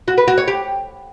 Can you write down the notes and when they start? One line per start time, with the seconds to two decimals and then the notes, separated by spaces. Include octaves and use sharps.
0.08 F#4
0.18 B4
0.28 F#4
0.38 C#5
0.48 G4